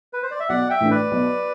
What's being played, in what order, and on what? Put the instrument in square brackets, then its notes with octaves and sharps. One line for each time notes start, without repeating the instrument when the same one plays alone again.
[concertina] B4
C5
D5
E5
[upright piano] B1 [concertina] D5 F#5
[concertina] E5 G5
[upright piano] A2 E3 A3 D4
[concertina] B4 D5
[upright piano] B1